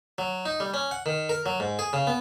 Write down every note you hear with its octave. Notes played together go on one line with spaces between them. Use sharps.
F#3
D#4
G3
C#4
F#5
D#3
A#4
F#3
G#2
G#4
C#3
B3